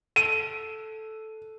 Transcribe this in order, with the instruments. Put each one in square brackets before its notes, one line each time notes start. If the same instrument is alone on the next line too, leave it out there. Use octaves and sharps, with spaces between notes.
[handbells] A4 [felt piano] D#7